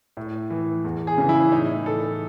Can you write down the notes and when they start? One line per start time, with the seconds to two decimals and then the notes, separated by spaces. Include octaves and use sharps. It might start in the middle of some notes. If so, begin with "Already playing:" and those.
0.17 A2
0.50 E3
0.85 E2
1.07 G#4
1.18 C#3 E3
1.29 E4
1.52 A2 D#4
1.86 E3 A4